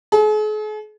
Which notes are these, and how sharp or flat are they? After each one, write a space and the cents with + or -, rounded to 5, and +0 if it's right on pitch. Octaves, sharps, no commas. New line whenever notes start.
G#4 +45